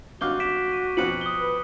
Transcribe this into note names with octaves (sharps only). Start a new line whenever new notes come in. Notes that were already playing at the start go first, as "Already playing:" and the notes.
G#1 G2 F#4 F5 D6 G6 G7
B6 D7 E7
D#7
F2 B2 F3 F#6 C#7 F#7
D#6 G7
B4